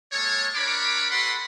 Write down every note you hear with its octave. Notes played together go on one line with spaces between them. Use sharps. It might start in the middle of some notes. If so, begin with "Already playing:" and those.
G#3 A#3 A4 C#5
D4 A#4 C#5 B5 D6
F#4 A4 B4 F#5 B5 C6